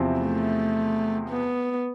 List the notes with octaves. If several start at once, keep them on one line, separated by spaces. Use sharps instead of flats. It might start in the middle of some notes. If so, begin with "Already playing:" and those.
Already playing: E2 C3 F3 C4 E4
A3
B3